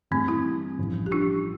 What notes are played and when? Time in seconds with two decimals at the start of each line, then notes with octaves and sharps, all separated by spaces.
0.11 G2 E3 G3 A3 C4
0.28 C4 E4
0.78 A1 G2 F3
1.06 G4
1.12 D4 F4